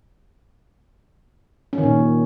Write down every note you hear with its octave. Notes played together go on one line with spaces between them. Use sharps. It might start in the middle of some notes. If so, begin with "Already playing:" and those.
C#4
D#3
A#2